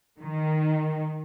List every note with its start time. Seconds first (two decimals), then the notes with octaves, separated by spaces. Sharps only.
0.21 D#3